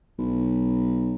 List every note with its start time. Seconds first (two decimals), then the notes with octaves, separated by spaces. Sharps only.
0.18 B1